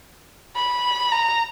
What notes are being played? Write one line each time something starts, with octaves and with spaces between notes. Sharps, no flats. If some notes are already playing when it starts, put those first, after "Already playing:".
B5
A#5